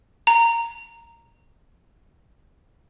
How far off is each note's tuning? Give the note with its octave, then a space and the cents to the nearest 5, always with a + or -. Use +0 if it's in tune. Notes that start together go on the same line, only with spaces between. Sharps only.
A#5 -5